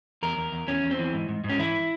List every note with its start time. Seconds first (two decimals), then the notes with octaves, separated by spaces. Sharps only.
0.23 E2 A#4
0.37 E2
0.52 E2
0.67 E2 C#4
0.83 E2
0.91 C4
0.99 E3
1.14 G#2
1.29 G#2
1.44 G#2
1.50 C#4
1.59 E3 E4